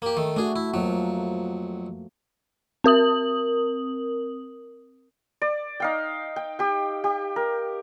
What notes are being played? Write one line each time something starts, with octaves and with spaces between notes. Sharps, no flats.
A#3 G4
D#3 A3
A3 D4 F#4 G#4
E4
F2 F3 F#3 A#3
C4 A#4 D#6 F#7
D5
D#4 F5 G5
G5
G4 G5
G4
A#4